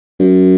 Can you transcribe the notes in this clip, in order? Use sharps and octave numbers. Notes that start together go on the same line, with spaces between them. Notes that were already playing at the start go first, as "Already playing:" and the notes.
F#2